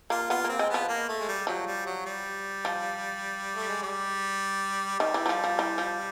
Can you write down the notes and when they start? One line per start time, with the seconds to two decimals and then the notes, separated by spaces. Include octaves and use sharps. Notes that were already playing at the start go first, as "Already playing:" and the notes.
0.10 A#3 F4
0.30 B3 F4
0.44 A#3 C4
0.59 G#3
0.70 F3 B3
0.88 A#3
1.09 A3
1.20 G#3
1.28 G3
1.47 F3 F#3
1.67 G3
1.86 F#3
2.06 G3
2.65 F3
3.55 A3
3.69 G#3
3.82 G3
5.00 D#3 G3
5.14 E3
5.26 F#3
5.29 F3
5.44 F3
5.59 E3
5.78 F3